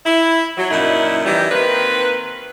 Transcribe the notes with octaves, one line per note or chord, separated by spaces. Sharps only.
E4
F#3
F#2 A#2 F#3 D#4 E4
D#3 E3 G3
D#3 A#3 C4 B4